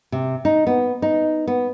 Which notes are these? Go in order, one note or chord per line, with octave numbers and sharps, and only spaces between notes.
C3
D#4
B3
D#4
B3